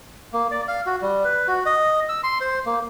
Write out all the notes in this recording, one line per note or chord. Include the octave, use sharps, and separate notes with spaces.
A#3
D5
F5
F#4
G3
B4
F#4
D#5
E6
C6
C5
A#3